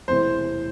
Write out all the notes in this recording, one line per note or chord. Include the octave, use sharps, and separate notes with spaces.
E1 E2 C3 E3 A3 C5